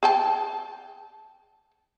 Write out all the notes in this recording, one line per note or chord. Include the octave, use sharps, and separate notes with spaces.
G#4 G5 A5